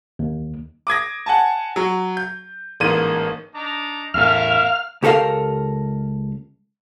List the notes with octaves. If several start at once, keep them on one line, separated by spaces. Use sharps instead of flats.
D#2
D6 D#6 G#6 A#6
F#5 G#5 A5
F#3
G6
A1 G#2 A#3 D#7
D4 D#4 A#5
E2 A2 A#4 E5 F5 F6
C#2 G4 A4 A#4 F5